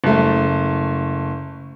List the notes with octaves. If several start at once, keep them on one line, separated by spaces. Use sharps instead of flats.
F#1 A3